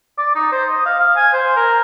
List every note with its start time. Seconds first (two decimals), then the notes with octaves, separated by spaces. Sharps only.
0.18 D5
0.35 D#4
0.52 C5
0.70 D#5
0.85 F5
1.00 F5
1.16 G#5
1.33 C5
1.56 A#4